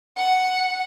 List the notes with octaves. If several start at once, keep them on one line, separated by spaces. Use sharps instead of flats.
F#5